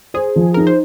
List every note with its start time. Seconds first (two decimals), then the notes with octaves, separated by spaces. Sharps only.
0.14 G#4 C5
0.36 F3
0.54 D#4 A#4
0.67 C5